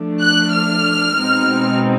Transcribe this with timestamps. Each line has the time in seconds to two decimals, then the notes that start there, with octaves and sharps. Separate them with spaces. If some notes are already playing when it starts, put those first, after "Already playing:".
Already playing: F3 A3 D4
0.21 F#6
0.53 F6
1.18 B2 G#3 C4 D#4